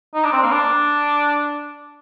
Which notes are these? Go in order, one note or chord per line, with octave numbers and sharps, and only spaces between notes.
D#4
D4
C4
A#3
D4